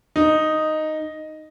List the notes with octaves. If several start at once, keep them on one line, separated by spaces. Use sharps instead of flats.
D#4